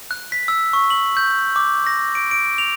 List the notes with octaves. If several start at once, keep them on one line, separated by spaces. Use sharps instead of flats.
F#6
B6
E6
C#6
F#7
G6
D6
A#6
D7
D7
F7